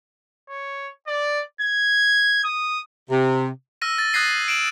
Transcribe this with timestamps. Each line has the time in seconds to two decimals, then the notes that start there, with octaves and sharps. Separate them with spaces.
0.49 C#5
1.07 D5
1.61 G#6
2.44 D#6
3.10 C3
3.81 E6 F6 A#6 D#7
3.98 A6
4.13 D#6 F#6 G#6 A#6 C7 D#7
4.48 D7 E7 F#7